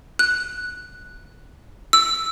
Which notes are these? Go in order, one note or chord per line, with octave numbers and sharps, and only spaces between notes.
F#6
E6